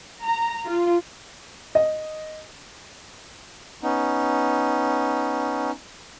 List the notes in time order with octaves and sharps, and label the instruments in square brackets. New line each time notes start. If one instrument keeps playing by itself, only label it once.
[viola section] A#5
F4
[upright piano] D#5
[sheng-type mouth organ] B3 C#4 D#4